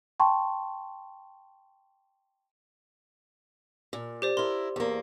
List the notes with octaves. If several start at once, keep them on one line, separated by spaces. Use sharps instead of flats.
G5 A5 C6 C#6
A#2
G4 C5 D5
E4 A#4 C6
E2 A#3